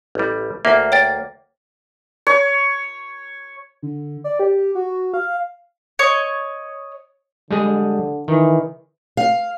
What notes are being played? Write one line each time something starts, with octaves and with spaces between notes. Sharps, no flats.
A1 G3
D2 A#3 E5
C#5 G5 A6
C#5
D3
D5
G4
F#4
F5
C#5 D#5
D3 G3 G#3 G#4
D#3 E3
F5